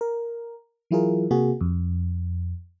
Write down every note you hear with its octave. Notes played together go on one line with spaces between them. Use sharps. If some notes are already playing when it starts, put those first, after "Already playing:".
A#4
E3 F#3 E4 F4 G#4 A#4
C3 A#3 F#4 G#4
F2